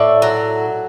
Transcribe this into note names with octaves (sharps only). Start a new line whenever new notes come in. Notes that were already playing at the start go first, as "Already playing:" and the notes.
Already playing: A2 D5 E5
F#3